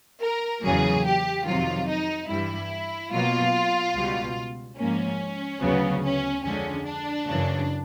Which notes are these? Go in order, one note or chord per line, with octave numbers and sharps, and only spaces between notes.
A#4
E2 C#3 F#3 A#3 G#4
G4
F2 C3 D#3 F#3 F4
D#4
G2 E3 G3 E4
B2 F#3 A#3 F4
C#2 B2 G3
G#2 F3 A#3 C#4
D2 C#3 F#3 B3
C#4
F2 D3 F3 G#3 C#4
D4
F#2 C#3 E3